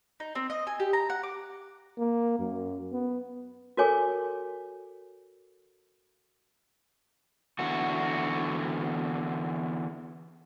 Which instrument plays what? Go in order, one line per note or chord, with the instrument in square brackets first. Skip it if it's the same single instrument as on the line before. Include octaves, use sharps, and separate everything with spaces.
[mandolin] D#4
C4
D#5
G#5
G4
A#5
F#5
D6
[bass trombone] A#3
F#2
B3
[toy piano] F#4 A4 A#4 C#5 G#5 D6
[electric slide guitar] E2 D3 F#4